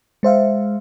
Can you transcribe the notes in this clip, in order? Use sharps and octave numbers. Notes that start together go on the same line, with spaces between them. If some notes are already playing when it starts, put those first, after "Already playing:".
G#3 C5 E5 F5